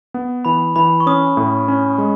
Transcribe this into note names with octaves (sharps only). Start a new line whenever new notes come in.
B3
E3 B5
E3 B5
C#6
C#4 D#6
A2
C#4
G#3